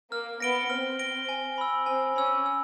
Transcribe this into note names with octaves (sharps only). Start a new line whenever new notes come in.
A#3 F6
B3 A#6 D7 G7
C4 F6
A#6 D7 G7
G#5
B5 E6
C4 G#5
C#4 B5 E6
E6